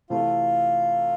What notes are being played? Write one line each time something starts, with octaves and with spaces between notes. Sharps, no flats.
C3 E3 A3 E4 F4 A4